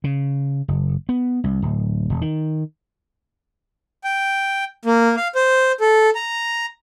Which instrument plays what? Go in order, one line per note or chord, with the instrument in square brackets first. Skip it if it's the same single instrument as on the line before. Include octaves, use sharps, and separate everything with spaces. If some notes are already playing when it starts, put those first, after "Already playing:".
[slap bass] C#3
F#1
B3
C2
D1
E1
D#3
[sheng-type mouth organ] G5
A#3
F5
C5
A4
A#5